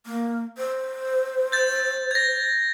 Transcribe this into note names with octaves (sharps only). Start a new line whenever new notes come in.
A#3
C5
G6 A6
G#6 A#6